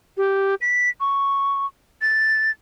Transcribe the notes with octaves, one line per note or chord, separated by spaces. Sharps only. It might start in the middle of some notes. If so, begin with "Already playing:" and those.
G4
B6
C#6
A6